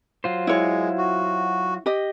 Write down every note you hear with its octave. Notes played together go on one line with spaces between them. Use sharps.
F#3 F4 C5
G#3 E4 C#5
F#4
G4 D#5